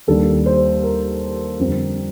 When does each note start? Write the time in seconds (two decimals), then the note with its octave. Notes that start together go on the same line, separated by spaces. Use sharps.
0.07 D#2 D#3 G3 D4 A4
0.46 C5
0.83 A#4
1.59 F2 D3 G3 C4